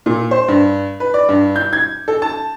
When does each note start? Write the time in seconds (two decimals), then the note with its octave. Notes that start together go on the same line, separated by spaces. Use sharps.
0.06 A#2
0.31 C5
0.48 G2
1.00 B4
1.14 D5
1.29 G2
1.56 G6
1.73 G#6
2.08 A4
2.22 A5